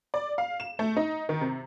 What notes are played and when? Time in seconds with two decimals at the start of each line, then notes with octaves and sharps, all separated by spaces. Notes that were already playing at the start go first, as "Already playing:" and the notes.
0.14 D5
0.38 F5
0.60 E7
0.79 A3
0.97 D#4
1.29 D#3
1.41 C3